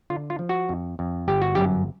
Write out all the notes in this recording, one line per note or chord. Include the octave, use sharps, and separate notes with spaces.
D3 F4
F4
F3
F#4
F2
F2
G1 G4
F#4
F#2 G4